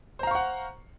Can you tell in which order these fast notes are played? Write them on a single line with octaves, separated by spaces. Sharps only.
C5 A#5 F5 C#6 F#5